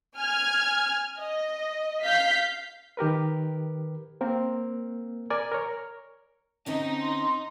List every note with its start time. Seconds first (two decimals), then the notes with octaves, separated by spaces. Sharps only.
0.17 G#5 F6 G#6
1.19 D#5
2.04 F5 G6 B6
2.97 D#3 G4 A#4 B4
4.21 A#3 C4 A#4
5.30 A#4 D5 G#5
5.52 A#4 C#5
6.66 D3 C4 C#4 D#4
7.01 C6